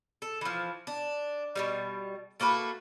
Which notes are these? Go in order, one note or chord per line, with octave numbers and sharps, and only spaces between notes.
A4
E3 F3
D4
B2 D3 G3
A3 A#3 F#4 B4